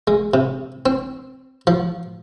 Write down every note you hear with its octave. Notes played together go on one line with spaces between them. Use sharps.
G#3
C3
C4
F3